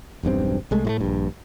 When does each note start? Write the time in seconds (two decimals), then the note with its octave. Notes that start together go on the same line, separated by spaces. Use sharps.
0.23 E1 B1 G2 C4
0.71 C2 G#3 A3
0.85 A2 G#3 A3
1.01 A#1 G2